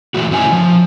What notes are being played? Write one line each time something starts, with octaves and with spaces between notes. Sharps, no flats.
A#2 E3 A3 F#4
A#2 C#4 E4 G#5
F3